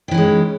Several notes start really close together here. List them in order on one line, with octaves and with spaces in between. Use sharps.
D#3 E3 C#4 G#3